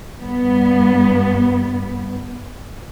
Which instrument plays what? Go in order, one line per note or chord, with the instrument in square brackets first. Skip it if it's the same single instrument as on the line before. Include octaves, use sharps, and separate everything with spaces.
[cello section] G2 B3